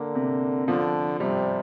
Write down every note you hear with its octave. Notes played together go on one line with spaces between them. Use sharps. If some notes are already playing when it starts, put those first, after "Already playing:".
Already playing: D3 A#3
C3
D3 F3
C3 G3